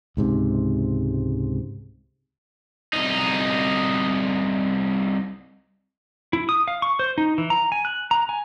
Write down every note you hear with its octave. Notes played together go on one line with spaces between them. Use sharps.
C#2 G#2 C3
C2 D#4
E4
D#6
F5
C#6
C5
D#4
E3
A#5
G#5
F#6
A#5
G#5